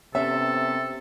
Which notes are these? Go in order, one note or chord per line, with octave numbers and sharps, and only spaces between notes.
C3 B3 C#4 A4 E5